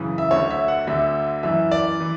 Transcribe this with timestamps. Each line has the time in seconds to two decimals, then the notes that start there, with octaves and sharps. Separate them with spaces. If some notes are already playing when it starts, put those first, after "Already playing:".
Already playing: F#2 C#3 E3
0.18 E5
0.31 D2 D3 C#5
0.51 E5
0.68 F#5
0.87 D2 D3 E5
1.43 F#2 E3 E5
1.72 D5
2.00 E3